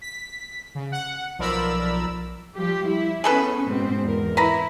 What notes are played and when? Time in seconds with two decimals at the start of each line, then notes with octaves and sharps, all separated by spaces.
0.01 B6
0.75 C#3
0.92 F#5
1.39 B1 F3 A#4 D5 B5 E6
2.55 F3 G3 G4
2.85 E4
3.24 B3 C#4 G#4 A4 B4
3.65 G#2 B2 C4
4.03 E2 A#4
4.37 E4 B4 A#5 B5